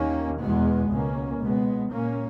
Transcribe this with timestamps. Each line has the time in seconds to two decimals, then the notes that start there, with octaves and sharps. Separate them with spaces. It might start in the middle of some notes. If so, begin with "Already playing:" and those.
Already playing: D#2 D#3 A#3 C#4
0.40 E2 B2 G#3 B3
0.90 C#2 B2 A#3 C#4
1.41 C#2 B2 G#3 B3
1.91 A#2 A#3 C#4